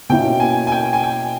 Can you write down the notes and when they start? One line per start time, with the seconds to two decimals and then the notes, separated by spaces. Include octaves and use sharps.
0.09 B2 A#3 C#4 E4 G5
0.40 G#5
0.67 G#5
0.72 G5
0.93 G#5
1.03 G5